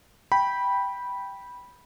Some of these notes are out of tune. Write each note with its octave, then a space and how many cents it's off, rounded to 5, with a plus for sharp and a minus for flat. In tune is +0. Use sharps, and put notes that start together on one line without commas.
G5 +0 B5 -10